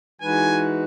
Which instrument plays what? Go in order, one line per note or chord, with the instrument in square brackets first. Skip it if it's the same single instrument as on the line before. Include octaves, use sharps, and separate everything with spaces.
[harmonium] E3 G#3 D#4 F#4 B4 [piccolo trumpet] G#5